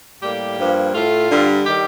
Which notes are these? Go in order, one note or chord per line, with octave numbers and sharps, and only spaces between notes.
A2 G3 A#3 G4
G2 F3 A#3
A2 A3 F4
G2 D3 G3
D#3 G3 G4